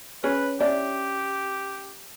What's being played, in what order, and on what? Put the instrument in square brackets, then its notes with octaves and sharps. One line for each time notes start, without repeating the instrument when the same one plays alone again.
[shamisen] C#4 G#4 C#5 [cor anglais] B4
[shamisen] C#4 D4 E4 [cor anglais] G4